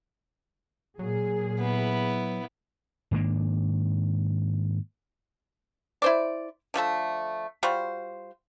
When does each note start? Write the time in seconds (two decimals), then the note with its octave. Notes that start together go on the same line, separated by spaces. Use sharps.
0.99 A#2 F#3 G#4
1.60 B3 E4
3.11 G#2 D#3 A#3 D4
6.02 E4 C5 D5
6.74 D3 F3 A3 A4
7.63 G3 F4 F#4 C5